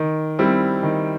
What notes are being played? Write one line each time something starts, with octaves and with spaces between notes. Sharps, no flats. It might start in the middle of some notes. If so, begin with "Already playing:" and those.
Already playing: D#3
G3 C4 E4
D#3